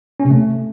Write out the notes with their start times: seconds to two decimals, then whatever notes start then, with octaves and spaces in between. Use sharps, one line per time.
0.20 C#4
0.25 C3
0.30 A3